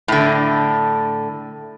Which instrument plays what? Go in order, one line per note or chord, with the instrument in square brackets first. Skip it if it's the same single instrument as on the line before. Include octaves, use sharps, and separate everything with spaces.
[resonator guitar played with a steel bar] A2 D3